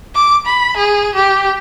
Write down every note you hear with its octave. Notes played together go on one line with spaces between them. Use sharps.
D6
B5
G#4
G4